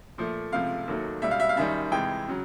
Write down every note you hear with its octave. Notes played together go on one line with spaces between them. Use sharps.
A#2 F3 A3
C#2 C3 F3 A3 F5
D#2 D#3 F#3 A3
C#2 B2 G3 E5
F5
E5
F5
F#2 D#3 G3 E5
F2 C3 E3 G#3 G5
C#3 F#3